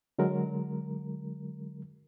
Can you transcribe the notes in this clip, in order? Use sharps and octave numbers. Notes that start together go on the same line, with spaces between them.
D3 F#3 G#3 A#4